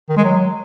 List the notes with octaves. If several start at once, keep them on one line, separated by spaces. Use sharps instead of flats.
D#3
G#3
F#3